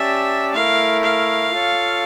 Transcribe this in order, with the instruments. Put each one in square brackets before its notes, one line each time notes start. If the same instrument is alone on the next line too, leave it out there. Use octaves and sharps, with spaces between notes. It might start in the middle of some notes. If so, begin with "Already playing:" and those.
Already playing: [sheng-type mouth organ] C#4 G4 D5 A5 [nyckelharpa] E5
[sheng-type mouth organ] A3 E4 A#4 [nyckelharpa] F5
[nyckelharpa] F5
[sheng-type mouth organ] F4 A4 C#5